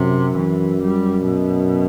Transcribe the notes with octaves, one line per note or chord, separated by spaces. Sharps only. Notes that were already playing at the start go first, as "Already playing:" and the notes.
Already playing: F#2 C3
E3
G3
B2